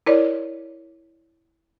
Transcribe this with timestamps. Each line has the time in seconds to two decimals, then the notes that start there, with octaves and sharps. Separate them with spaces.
0.06 E4 A#4 C#5 D5